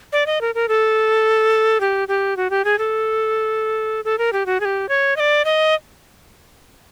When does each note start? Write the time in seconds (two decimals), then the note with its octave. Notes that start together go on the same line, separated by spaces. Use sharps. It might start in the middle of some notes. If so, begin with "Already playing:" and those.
0.12 D5
0.26 D#5
0.41 A#4
0.55 A#4
0.68 A4
1.80 G4
2.08 G4
2.37 F#4
2.50 G4
2.65 G#4
2.79 A4
4.05 A4
4.18 A#4
4.33 G4
4.46 F#4
4.60 G#4
4.65 G4
4.89 C#5
5.16 D#5
5.20 D5
5.45 D#5